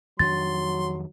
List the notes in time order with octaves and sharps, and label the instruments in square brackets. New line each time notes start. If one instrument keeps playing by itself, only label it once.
[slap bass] F2 D#3 D4 [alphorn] F#3 [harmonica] C6 [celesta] A6